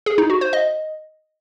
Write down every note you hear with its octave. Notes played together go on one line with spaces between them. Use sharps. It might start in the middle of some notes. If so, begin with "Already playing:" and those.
G#4
D#4
F#4
C5
D#5